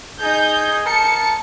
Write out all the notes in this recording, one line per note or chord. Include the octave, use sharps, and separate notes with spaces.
D#4 G#4 G6
A#4 A5 C#7